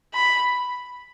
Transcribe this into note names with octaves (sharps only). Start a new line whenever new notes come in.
B5